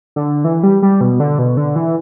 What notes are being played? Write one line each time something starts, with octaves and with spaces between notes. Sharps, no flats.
D3
E3
G3
G3
B2
D3
B2
D3
E3